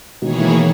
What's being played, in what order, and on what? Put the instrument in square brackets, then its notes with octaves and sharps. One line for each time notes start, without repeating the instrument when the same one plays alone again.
[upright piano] B2 D#3 [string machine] E3 A#3 E4 G#4 C#5
[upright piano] B2 D#3